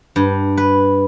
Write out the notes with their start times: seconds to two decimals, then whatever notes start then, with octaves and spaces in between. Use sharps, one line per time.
0.16 G2
0.57 B4